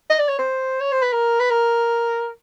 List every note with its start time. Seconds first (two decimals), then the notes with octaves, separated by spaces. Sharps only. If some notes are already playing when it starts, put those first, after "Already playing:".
0.10 D#5
0.19 D5
0.29 C#5
0.39 C5
0.81 C#5
0.92 C5
1.02 B4
1.13 A#4
1.40 B4
1.50 A#4